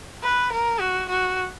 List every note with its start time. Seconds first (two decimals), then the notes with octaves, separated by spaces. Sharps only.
0.23 B4
0.52 A#4
0.80 F#4
1.09 F#4